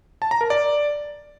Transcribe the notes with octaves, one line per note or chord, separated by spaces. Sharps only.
A5
A#5
A#4
D5